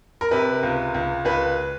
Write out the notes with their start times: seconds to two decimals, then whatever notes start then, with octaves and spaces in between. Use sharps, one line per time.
0.21 A#4
0.31 C3 B4
0.63 C#2
0.94 C#2
1.25 C#2 B4